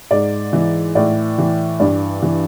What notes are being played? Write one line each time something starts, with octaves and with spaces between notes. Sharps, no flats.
G#2 D5
E3
A2 D5
E3
G2 D5
E3